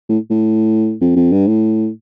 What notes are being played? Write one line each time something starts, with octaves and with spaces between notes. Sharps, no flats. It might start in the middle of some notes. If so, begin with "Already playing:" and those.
A2
A2
F2
F2
G2
A2